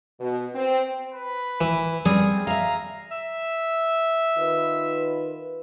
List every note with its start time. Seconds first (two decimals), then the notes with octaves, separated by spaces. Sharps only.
0.20 B2
0.55 C4
1.13 B4
1.61 E3
2.06 G3 C4 G#4
2.47 E5 F5 A#5
3.11 E5
4.37 D#3 F4 B4